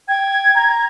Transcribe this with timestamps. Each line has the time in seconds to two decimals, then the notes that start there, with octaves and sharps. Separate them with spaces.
0.08 G5 G#6
0.55 A#5 G#6